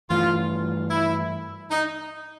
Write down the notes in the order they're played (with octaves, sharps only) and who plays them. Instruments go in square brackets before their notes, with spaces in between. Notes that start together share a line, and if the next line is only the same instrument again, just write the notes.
[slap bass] G2 E3 A3 [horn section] F4
[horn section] E4
D#4